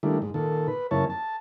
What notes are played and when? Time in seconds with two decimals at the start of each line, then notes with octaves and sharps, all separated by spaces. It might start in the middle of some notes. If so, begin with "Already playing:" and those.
0.03 D#3 G3 A3 A#3 D4 E4
0.22 G#2
0.34 A#2 D#3 A4
0.68 B4
0.91 F#2 C#3 A#3 E4 C#5 A5
1.10 A5